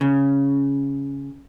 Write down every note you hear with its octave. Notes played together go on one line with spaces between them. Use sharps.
C#3